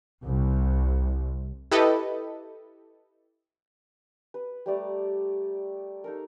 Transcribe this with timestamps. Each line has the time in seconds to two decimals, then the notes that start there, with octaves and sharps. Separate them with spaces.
0.24 C2
1.72 E4 G4 A4 B4 D#5
4.34 B4
4.66 G3 A3 D5 A#5
6.04 D#4 A4 A#4